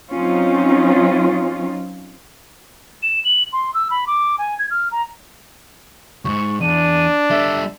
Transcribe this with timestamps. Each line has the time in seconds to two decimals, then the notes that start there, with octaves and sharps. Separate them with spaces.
0.12 F#3 C4 C#4 D#4 F4
3.03 E7
3.25 F#7
3.53 C6
3.74 E6
3.91 B5
4.07 D6
4.38 G#5
4.59 G#6
4.71 F6
4.92 A#5
6.25 D#2 G#2 C#6
6.61 E2 D4 D#7
7.30 G3 A4 E5